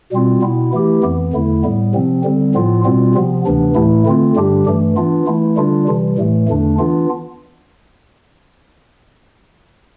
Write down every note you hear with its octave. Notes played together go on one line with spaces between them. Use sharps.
B2 G3 C4 F4
B2 B3 E4
E3 A3 E4 G4
F2 E3 B3
E2 D3 A3 E4
A2 G3 B3
C3 F3 C4
D3 G3 C4
A2 F3 B3 F4
B2 G3 C4 F4
C3 F3 B3
D2 C3 E3 B3 D4
A2 E3 A3 E4
D3 A3 C4 F4
G2 D3 G3 D4 G4
G2 E3 A3
E3 B3 D4 F4
E3 A3 E4
D3 G3 D4 F4
C3 E3 G3
A2 E3 A3
E2 D3 A3 D4
E3 B3 D4 F4